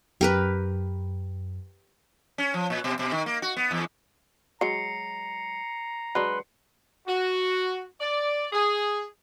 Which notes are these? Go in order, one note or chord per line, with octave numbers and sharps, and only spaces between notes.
F#2 G4 A#4 B4
C#4
F3
A#2
B2
B2
D#3
A#3
F#4
B3
E2
F#3 G#3 A#5 C7 C#7
F#3 G#3 D4 B4 C6
F#4
D5
G#4